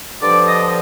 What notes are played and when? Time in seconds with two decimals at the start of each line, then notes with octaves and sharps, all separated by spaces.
0.22 G2 D3 F3 D5
0.47 D#5